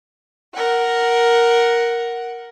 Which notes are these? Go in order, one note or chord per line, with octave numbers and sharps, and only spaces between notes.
A#4 F#5